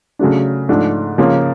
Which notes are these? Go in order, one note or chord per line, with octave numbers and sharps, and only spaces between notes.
C#3 F#3 A3 D4
G#2 F3 A3 D4
C#3 F3 A#3 C#4